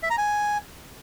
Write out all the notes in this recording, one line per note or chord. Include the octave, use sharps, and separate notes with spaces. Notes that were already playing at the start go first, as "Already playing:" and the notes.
E5
A#5
G#5